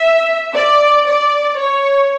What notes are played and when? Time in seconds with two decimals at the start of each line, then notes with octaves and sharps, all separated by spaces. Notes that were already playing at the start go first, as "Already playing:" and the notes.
Already playing: E5
0.54 D5
1.06 D5
1.59 C#5